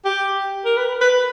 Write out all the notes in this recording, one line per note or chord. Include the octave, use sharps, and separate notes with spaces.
G4
A#4
B4
B4